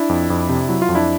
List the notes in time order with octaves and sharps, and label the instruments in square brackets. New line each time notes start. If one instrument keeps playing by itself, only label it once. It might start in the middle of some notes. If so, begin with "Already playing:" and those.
Already playing: [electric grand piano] D4 E4
F2
F2
C3
F#3 E4
F4
F2
D4 E4